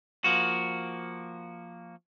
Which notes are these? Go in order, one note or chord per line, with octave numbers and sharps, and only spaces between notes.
F3 A#3 F#4